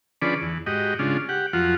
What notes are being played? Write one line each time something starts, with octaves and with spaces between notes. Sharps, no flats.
D3 F3 C#4 G#4 B4 D5
E2
G#2 F#4 G4 D#5
C#3 G#3 D4 F4
G4 F#5
F2 F3 F#3 F4 F#5